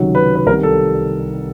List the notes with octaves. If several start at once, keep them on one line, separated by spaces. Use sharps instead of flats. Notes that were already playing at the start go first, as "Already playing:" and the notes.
Already playing: C#2 C3 D#3 F#3
B4
B4
C2 C3 D#3 A#4
A4